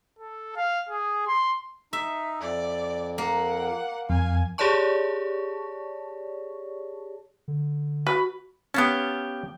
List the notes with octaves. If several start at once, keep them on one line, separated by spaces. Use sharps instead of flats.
A4
F5
G#4
C6
D#4 E5
F2 D5
A#3 F#5
F2 F5 G#5
G4 G#4 C#5 D5 A5 C#6
D3
F#4 B4
B3 C#4 G4 F5 A5